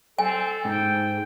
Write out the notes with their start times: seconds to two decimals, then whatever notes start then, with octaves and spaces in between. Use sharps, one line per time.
0.19 C4 A4 G#5
0.65 G#2 G5